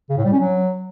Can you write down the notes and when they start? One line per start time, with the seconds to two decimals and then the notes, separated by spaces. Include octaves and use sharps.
0.10 C#3
0.17 A2
0.25 G3
0.32 C#4
0.40 F#3